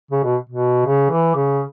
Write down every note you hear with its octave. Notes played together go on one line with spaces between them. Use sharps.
C#3
B2
B2
C#3
E3
C#3